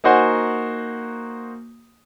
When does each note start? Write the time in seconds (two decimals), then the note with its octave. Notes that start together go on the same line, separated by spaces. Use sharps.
0.04 A#3 D#4 F#4 C5 F#5 G#5